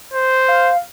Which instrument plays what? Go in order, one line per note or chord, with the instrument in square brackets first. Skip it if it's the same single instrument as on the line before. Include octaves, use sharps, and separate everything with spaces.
[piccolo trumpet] C5
[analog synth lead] F5